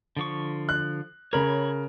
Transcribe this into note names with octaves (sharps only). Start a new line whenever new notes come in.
D3 F3 C#6
F#6
C#3 A#4 C#5 B5